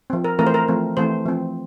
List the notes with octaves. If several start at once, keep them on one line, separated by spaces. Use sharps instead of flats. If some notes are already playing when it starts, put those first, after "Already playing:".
F3 C4
A#4
E3 A3 C4 A#4
C5
A#4
F3 A3 C4
E3 A3 C4 C5
F3 C4